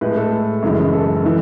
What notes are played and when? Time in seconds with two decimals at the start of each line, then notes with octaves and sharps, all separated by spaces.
0.01 A2 G#3 B4
0.16 A4
0.62 F#2 C#3 E3 G#3
0.93 A4
1.24 E3 G#3